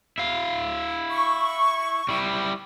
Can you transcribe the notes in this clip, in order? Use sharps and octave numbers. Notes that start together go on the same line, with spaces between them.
E4 F5
C#6
G3 E4